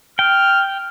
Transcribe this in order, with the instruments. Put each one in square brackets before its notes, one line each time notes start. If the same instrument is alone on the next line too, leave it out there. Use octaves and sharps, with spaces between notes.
[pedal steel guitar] G5 [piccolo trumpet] F6